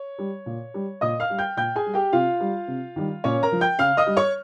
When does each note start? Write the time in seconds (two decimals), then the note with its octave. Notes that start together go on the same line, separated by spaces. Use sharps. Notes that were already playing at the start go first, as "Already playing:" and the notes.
Already playing: C#5
0.19 G3
0.46 A#2
0.74 G3
1.01 A#2 D#5 D#6
1.20 F5 F6
1.30 G3
1.38 G5 G6
1.57 A#2 G5 G6
1.76 G#4 G#5
1.86 G3
1.94 G4 G5
2.12 C3 F4 F5
2.40 G3
2.68 C3
2.96 D#3 G3
3.24 A#2 C#4 C#5
3.43 A#4 A#5
3.52 F3
3.61 G5 G6
3.79 C#3 F5 F6
3.97 D#5 D#6
4.07 G3
4.17 C#5 C#6